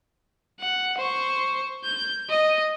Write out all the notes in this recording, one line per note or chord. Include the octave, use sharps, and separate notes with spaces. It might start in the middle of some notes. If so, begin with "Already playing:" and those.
F#5
C5 C#6
G6
D#5